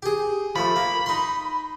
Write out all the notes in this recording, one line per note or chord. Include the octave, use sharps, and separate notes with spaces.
G4 G#4
F3 A3 B5
A#3
D#4 C6